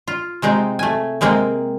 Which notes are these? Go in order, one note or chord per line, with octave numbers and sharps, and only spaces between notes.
F4
C3 G#3 C4 D#4
A3 G#5
C3 G#3 A#3 C4